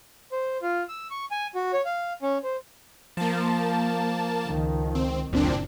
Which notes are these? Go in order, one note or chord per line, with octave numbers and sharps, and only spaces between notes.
C5
F4
E6
C#6
G#5
F#4
C#5
F5
C#4
C5
F3 A#3 A5
C#2 D#3
C4
F#1 D2 A#2 C4 D4